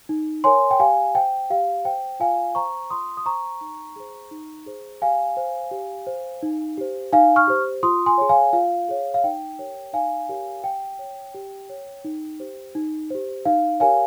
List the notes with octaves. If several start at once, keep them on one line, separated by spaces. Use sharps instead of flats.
D#4
A#4 C#5 G#5 C6
G5
G4 F5 G#5
C5 G5
G4 F5
C5 G5
F4 F5 G#5
C5 A#5 C#6
F4 C6 D#6
D#6
C5 A#5 C#6
D#4
G#4 C5
D#4
G#4 C5
G4 F5 G#5
C5
G4
C5
D#4
G4 C5
D#4 F5 G#5
C#6 F6
G4 C5
F4 C6 D#6
G#5 C6
G#4 C#5
F5 G#5
F4 F5
G#4 C#5
F5
D#4 G5
G4 A#4 C#5
D#4 F5 G#5
G4 A#4 C#5
G4 G5
C#5
G4
C#5
D#4
G4 C5
D#4
G4 C5
D#4 F5
G4 A#4 C#5 F5 G#5